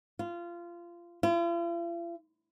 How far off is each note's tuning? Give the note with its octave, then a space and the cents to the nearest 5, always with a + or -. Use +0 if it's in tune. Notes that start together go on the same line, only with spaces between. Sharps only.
F4 -20
F4 -45